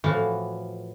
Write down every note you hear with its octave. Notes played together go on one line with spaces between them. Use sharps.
A2 E3 F3 F#4 F5